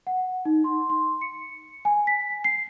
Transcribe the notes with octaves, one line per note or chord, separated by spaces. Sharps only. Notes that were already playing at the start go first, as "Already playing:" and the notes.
F#5
D#4
C6
C6
C#7
G#5
B6
C7